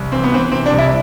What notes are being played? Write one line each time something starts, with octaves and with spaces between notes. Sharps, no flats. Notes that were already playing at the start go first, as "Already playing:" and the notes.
Already playing: C2
E3 C4
B3
E3 C4
C3 C4
D4
C2
E4